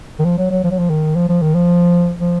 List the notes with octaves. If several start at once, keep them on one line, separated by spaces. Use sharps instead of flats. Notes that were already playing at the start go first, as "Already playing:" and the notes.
D#3
F3
F#3
F#3
F3
F#3
F3
D#3
F3
F3
D#3
F3
F3